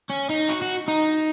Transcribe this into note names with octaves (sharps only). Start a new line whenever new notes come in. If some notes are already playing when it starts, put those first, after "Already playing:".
C#4
D#4
F#4
F#4
D#4